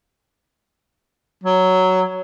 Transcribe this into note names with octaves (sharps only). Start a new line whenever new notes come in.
F#3